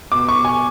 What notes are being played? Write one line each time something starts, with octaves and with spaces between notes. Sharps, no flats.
B2 D6
C#6
B2
G#5